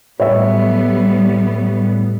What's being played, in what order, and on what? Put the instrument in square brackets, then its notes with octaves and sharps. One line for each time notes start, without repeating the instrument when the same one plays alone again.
[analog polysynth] A2 [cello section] F#3 G3 B3 [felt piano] C#5 E5